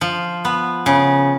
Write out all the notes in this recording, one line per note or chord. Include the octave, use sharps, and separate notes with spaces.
F3
B3
C#3